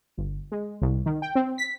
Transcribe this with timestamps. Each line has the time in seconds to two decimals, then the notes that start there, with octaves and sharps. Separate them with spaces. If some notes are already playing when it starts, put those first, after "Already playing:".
0.17 G1
0.52 G#3
0.82 C2
1.06 D#3
1.22 G5
1.35 C4
1.58 B6